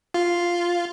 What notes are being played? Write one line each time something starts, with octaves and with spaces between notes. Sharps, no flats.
F4